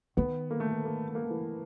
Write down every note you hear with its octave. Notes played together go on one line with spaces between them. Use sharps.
D#3 B3
A#3
A3
A#3
A#3
A3
A#3
A3
E3